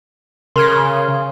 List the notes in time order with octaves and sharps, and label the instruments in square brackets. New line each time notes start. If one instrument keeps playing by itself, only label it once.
[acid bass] C#3 [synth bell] A#4 F6 G#6 [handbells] C6